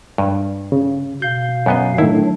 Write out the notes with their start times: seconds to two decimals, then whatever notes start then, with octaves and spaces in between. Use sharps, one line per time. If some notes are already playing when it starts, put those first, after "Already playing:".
0.18 G2
0.72 C#3
1.22 B2 F5 G6
1.66 F#2 B3 D#5
1.98 A2 D#3 F#3 D4 E4